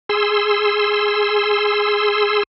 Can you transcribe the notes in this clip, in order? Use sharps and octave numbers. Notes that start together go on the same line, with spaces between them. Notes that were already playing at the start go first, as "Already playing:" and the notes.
G#4 C6 E6